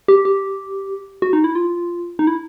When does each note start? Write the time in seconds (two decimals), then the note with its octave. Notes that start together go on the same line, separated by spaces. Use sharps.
0.08 G4
0.25 G4
1.22 F#4
1.33 D#4
1.44 E4
1.55 F4
2.19 D#4
2.27 E4